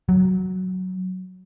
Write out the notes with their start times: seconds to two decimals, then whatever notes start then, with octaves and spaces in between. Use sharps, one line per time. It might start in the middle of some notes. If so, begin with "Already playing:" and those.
0.09 F#3